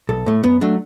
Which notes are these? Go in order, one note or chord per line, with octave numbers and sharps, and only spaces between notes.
B1 A4
A2 A3
F#2 B3
F#3 A3 D4